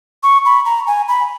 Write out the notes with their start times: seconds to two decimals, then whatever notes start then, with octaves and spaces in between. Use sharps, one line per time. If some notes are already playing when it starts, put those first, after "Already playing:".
0.23 C#6
0.45 B5
0.65 A#5
0.87 G#5
1.08 B5